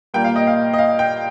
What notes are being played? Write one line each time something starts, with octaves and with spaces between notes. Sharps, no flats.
A#2 G3 A#3 G5
F5
D#5
F5
D#5
F5
G5